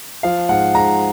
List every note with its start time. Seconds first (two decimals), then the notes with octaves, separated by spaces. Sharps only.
0.23 F3 F5
0.49 G#2 F#5
0.74 G#2 A#5